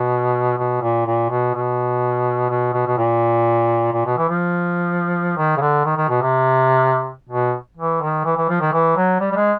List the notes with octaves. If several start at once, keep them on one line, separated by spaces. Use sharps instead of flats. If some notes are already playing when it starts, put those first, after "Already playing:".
Already playing: B2
B2
A#2
A#2
B2
B2
B2
B2
B2
A#2
A#2
B2
E3
F3
D#3
C#3
D3
D#3
D#3
B2
C3
B2
E3
D#3
E3
E3
F3
D#3
E3
F#3
G3
G3
G#3